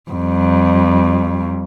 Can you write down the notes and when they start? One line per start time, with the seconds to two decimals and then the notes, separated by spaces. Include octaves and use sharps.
0.11 F2 G3